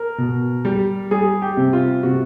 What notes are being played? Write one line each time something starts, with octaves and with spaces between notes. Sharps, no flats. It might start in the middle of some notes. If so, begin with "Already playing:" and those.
Already playing: A#4
B2
G3
G3 G#4
G4
C3
F4
C3 F#4